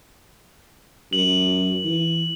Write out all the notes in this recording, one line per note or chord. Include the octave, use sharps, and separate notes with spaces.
F#2 F#7
E3